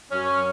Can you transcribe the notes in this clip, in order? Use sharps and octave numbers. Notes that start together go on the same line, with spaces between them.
F#2 F#3 C#4